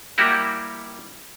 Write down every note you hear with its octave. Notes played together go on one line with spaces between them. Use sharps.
G3 A#3 E4 F#4 G4